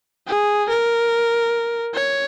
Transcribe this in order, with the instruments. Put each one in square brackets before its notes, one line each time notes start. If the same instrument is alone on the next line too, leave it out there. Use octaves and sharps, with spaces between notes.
[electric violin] G#4
A#4
C#5